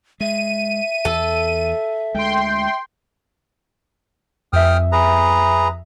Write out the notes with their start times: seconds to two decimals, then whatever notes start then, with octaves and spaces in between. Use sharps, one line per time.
0.20 G#3 E5 D#7
1.05 E2 A4
2.15 D2 G#3 G5 C6
4.53 F2 E5 G5 D#6 F6
4.92 G#4 B4 A#5